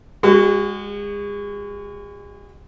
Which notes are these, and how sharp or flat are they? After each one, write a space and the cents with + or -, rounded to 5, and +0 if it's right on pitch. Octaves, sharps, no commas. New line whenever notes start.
G#3 -35 F#4 +10